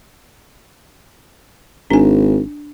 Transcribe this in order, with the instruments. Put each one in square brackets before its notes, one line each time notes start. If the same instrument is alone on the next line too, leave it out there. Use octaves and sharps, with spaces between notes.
[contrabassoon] G#1 [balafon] D4 G#5